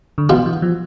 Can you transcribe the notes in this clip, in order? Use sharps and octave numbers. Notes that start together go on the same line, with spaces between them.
D3
B1 B2 E3 B3 F4
E3
F3